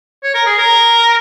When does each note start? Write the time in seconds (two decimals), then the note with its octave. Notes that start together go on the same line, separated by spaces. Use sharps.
0.23 C#5
0.34 A#4
0.46 G#4
0.58 A#4